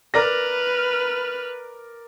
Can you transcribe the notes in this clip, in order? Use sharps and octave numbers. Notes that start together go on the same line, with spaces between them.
A#4 B4 D5 F6 A#6